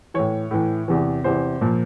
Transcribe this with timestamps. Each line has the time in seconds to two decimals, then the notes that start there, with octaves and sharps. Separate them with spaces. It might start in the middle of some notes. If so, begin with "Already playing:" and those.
0.14 A2 E3 C#5
0.51 A2 E3
0.88 E2 C3 E3
1.24 E2 C3 E3 C5
1.61 A#2 F3